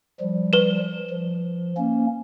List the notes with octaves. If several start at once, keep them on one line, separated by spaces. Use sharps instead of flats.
F3 G3
B4 E7
F3
A#3 C#4